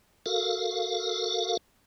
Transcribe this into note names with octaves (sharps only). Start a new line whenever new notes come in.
F#4 A4 A#4 F5